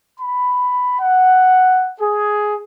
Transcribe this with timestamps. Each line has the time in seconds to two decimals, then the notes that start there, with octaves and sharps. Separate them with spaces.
0.19 B5
1.00 F#5
2.00 G#4